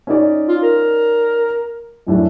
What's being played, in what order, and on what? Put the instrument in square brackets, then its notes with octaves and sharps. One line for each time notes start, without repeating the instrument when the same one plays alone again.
[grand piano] C#4 D#4 D5
[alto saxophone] F4
A#4
[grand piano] F#2 A2 D4